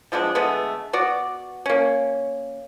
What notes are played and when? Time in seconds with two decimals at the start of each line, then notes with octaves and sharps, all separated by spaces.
0.12 F3 G#3 B3 D4
0.35 D3 G#3 A3 B3
0.93 B3 F#4 D5
1.66 A#3 C#4